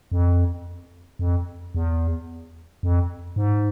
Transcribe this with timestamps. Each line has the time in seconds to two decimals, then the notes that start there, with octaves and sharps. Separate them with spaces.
0.12 F2
1.19 F2
1.75 E2
2.83 F2
3.36 G#2